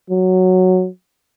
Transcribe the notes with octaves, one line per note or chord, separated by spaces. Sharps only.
F#3